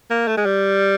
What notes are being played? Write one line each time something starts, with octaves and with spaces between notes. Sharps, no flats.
A#3
A3
G#3
G3